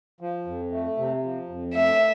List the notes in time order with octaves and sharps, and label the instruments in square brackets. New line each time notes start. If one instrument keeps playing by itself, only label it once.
[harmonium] F3
F2
A3
C3
F3
F2
[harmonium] A3 [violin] E5